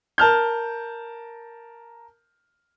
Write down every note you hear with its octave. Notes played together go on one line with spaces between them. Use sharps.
A#4 A5 F6 G6